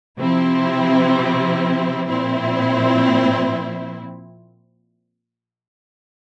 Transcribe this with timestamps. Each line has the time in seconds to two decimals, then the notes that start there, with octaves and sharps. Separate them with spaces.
0.18 C3 F3 C4 E4
2.08 A#2 F3 C4 E4